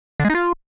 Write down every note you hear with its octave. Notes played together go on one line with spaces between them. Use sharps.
D3
G#3
D#4
F4